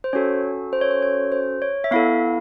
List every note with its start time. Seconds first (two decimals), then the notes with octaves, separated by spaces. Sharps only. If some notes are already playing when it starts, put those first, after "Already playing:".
0.04 C5
0.13 C#4 F#4 A4 C#5
0.73 C5
0.81 C#5
0.91 C5
1.02 C#5
1.32 C5
1.62 C#5
1.84 E5
1.91 B3 E4 A4 F5